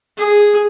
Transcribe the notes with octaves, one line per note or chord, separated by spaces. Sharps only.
G#4